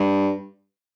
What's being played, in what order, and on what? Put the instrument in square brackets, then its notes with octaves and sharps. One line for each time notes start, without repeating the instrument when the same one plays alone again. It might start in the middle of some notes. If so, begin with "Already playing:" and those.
Already playing: [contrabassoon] G2